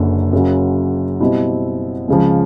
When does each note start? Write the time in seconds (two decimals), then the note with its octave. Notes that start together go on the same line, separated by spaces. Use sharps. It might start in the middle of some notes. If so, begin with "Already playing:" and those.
Already playing: F#1 F#2 D3
0.33 F#2 C#3 F#3
1.20 B2 G3 C4 E4 G4
2.08 C#2 C#3 F3